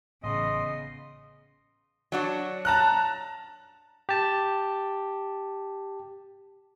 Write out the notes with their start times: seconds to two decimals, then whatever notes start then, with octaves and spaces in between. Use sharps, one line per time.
0.24 A1 C#3 B3 D#5 C6
2.12 F#3 D4 F#4
2.65 A5 A#5 F#6
4.09 G4 A5